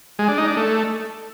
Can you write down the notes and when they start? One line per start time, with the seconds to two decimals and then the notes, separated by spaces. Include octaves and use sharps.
0.19 G#3
0.28 D4
0.38 D#4
0.47 D4
0.57 A3